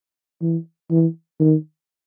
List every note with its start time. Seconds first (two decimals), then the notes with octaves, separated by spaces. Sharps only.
0.42 E3
0.91 E3
1.40 D#3